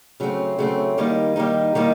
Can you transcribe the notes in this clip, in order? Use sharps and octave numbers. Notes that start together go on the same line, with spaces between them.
C#3 F#3 A3 C4
C#3 F#3 A3 C4
D#3 G3 A#3 D#4
D#3 G3 A#3 D#4
D#3 G3 A#3 D#4